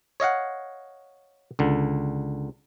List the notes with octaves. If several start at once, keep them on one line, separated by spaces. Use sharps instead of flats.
C#5 D#5 F5 F#5
C#2 D3